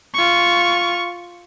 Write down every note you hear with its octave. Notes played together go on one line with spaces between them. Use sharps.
F4 C#6